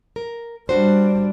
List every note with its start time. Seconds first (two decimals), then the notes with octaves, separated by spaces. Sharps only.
0.16 A#4
0.69 G3 D4 F#4 C5